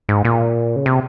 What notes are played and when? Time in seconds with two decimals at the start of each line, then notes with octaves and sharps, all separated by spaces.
0.09 G#2
0.25 A#2
0.76 C#3
0.86 C3